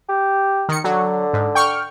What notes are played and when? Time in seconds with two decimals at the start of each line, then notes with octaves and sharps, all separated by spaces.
0.09 G4
0.69 D#3 C#7
0.84 D3 F#3
1.33 G#2
1.55 G5 C#6 F6